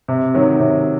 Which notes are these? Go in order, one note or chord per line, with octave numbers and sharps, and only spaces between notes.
C3
D#3 F#3
C3